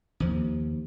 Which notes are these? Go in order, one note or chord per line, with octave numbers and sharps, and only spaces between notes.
D#2 F3